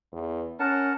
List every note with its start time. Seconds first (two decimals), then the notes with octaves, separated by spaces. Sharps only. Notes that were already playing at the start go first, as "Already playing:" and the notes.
0.13 E2
0.60 C#4 A#4 F#5 A5